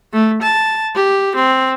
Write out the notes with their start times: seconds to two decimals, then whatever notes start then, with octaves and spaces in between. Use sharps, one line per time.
0.13 A3
0.42 A5
0.95 G4
1.36 C4